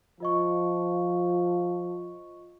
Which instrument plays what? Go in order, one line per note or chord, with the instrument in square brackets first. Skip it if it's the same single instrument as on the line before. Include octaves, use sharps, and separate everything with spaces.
[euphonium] F3 [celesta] F4 D#5 C#6